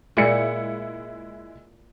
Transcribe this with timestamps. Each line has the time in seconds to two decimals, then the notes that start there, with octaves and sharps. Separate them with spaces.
0.17 A#2 G#3 E4 C#7